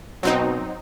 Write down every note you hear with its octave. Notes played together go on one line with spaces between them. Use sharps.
B2 F#3 C4 D#4